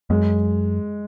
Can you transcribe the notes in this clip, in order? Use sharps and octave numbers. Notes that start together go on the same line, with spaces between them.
F#2 G#3